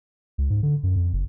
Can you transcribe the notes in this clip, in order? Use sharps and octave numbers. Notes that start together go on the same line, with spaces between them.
C#2
G#2
D3
F#2
F2
F#1